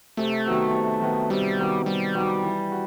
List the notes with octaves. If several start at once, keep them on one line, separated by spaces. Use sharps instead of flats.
C3 A3
D#3 F#3 B3 F#4
C3
D#3 F#3 B3 F#4
C3 G3
D#3 F#3 B3 F#4
C3 G3
D#3 F#3 B3 F#4
E3
F#4